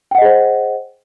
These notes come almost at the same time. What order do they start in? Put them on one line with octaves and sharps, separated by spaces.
G5 F#5 D#5 G#4 C5